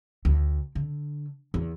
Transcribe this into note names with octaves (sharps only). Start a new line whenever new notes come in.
D2
D3
E2